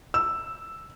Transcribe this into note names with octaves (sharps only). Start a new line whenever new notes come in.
E6